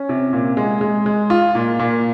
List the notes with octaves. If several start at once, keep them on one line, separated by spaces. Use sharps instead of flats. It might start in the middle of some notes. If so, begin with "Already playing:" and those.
Already playing: C#4
C3
A#2
G#3
G#3
G#3
F4
A#2
A#2